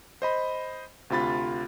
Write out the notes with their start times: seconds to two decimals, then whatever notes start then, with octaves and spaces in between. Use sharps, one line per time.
0.22 C5 D#5 B5
1.10 D2 C3 F4 B5 A6